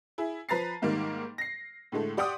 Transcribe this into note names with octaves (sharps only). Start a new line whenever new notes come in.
E4 G#4
F3 B4 A#5 A6 C7
G#2 D#3 G3 A#3
A#6 C7
A2 D3 G#3 A3
G4 D5 F#5 G5 C6 D#6